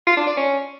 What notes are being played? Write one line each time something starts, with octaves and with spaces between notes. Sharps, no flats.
F4
D4
D5
C#4